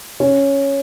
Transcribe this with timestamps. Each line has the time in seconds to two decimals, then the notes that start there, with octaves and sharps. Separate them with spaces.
0.20 C#4